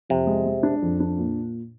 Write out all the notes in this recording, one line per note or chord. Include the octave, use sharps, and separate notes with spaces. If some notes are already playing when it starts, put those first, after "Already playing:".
F2 C3
G#3
G#3
D4
F2
D4
A#2